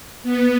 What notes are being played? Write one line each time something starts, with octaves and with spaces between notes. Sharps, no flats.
B3